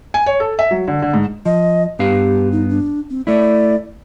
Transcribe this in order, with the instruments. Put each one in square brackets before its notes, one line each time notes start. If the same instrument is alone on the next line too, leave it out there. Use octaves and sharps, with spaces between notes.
[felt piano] G#5
C#5
A4
E5
F#3
D3
D3
G#2
[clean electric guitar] F3 [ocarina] D#5
[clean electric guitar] G2 B3 F5 [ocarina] G4
[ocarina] D#4
D4
C4
[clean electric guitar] A3 E4 [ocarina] D5